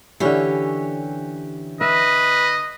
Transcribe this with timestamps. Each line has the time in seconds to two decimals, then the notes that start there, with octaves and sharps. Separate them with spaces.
0.20 D3 E3 C#4 E4 G4 C#5
1.81 B4 D#5 E5